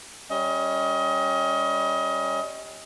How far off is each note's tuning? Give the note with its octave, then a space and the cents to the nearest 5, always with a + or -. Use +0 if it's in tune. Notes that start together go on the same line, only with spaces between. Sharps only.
G3 +0 C#4 +0 D#5 +30